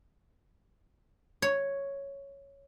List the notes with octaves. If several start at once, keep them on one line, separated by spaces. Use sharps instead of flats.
C#5